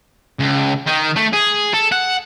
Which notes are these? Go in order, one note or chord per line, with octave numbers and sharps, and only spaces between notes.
C#2
D#3
A3
G#4
A4
F#5